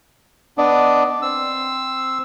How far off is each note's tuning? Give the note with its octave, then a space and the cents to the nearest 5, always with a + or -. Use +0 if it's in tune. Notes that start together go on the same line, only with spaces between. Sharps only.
B3 +0 D4 +0 D#5 +0
C4 +0 E6 +0